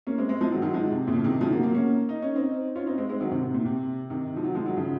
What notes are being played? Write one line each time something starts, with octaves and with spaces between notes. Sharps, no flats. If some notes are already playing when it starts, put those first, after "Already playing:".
A#3 C#4
G#3 C4
G#3 C4
F3 G#3
D#3 F#3
D#3 F#3
F3 G#3
C3
A#2 C#3
F3
C3 D#3
C#3 F3
F#3 A#3
F#3 A#3
A#3 C#4
D#4
C#4
C4 D#4
C#4 F4
C4 D#4
G#3 C4
G#3 C4
D#3 F#3
C3 D#3
C3
A#2
C3
C3 D#3
F3
D#3 F#3
F3 G#3
D#3 F#3
C#3 F3